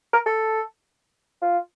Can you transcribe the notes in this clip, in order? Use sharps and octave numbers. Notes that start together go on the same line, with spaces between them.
A#4
A4
F4